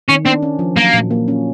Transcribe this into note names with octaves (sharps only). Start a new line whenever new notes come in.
D#3 C#4
C4 D4
C#4
F3
F#3 A#3
A#2
A#3
C#4